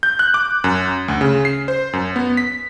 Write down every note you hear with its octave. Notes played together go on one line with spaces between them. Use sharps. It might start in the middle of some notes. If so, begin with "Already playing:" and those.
G6
F#6
D6
F#2
D2
C#3
C7
C5
F#2
B3
B6